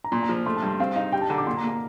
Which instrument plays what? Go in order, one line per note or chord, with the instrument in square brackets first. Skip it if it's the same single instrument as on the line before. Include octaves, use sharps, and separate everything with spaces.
[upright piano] A#5
[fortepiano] A#2 [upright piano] C6
[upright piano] A#5
[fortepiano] F3
[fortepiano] A3 [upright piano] C6
[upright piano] A5
[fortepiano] G2
[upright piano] C6
[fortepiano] C4 [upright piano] F5
[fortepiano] D#4 [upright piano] F5
[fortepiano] G3 [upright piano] G5
[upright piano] A5
[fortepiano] D3 [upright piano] A#5
[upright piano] D6
[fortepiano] A#2 [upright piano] C6
[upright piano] A#5
[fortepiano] A#3
[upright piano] A#5